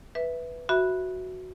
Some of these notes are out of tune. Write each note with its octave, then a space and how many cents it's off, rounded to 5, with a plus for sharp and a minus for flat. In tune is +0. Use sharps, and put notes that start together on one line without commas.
B4 +0 E5 +0
F#4 +0 E5 +0 B5 -5